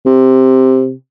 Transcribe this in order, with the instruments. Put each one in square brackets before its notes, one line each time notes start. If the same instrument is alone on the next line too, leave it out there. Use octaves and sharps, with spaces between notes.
[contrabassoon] C3